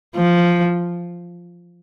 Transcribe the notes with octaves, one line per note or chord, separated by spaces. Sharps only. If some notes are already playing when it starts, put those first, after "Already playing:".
F3